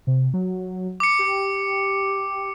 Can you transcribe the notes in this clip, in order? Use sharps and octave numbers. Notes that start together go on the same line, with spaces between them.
C3
F#3
D6 C#7
G4